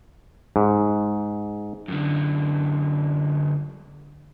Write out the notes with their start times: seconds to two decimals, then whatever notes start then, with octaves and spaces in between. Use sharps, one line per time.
0.56 G#2
1.88 F#2 D3